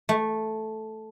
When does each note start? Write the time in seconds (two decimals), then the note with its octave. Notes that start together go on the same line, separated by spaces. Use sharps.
0.09 A3